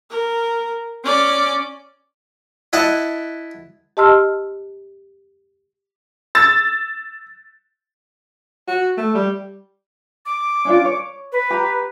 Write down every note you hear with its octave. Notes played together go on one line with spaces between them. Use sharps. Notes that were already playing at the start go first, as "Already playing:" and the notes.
A#4
C#4 D5
E4 D#5 F#5 A5
G4 D#5 A5 C6 E6 F6
E6 A6
F#4
A3
G3
D6
C#4 D4 F4
C#5
B4
G4 A#5